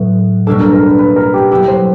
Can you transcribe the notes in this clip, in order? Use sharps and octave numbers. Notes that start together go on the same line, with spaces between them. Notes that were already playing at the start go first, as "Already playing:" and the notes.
Already playing: A2 F#3 B3
B2 G3 A#3 D4 A4
A#4
A#4
B4
B4
A#4
G4
F#3 B3 E4 G4 A4
C5